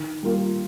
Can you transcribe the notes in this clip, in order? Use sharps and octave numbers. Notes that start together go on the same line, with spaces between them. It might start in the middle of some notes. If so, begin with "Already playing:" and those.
Already playing: D#3
G3 A#3 F4